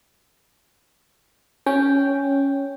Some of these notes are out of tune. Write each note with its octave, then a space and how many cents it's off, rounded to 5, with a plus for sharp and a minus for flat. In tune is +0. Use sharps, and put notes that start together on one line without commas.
C#4 +0 G5 +0